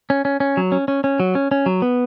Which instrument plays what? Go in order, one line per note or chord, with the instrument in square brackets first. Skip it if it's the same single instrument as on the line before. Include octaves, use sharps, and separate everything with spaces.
[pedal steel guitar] C#4
C#4
C#4
F#3
C#4
C#4
C#4
F#3
C#4
C#4
F#3
B3